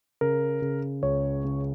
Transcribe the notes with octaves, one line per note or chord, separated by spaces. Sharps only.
C#3 A#4
C#3
C#2 C#5
C#3